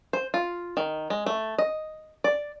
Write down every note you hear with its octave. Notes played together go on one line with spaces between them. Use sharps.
C5
F4
D#3
G#3
A3
D#5
D5